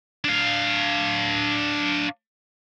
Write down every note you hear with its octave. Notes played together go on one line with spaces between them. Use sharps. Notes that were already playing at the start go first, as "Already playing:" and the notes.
D4 F5